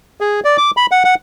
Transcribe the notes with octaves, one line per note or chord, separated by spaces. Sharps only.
G#4
D5
D6
B5
F#5
F#5